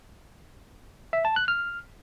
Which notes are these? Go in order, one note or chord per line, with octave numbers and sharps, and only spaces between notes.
E5
A5
F#6
F6